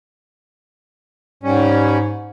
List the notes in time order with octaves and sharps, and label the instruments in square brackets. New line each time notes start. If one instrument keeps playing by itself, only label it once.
[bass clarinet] G#2 [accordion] G3 C#4